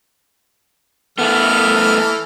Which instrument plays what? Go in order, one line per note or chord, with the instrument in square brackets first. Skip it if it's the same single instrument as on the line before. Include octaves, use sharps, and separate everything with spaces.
[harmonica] E3 A4 F6 [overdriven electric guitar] A3 B3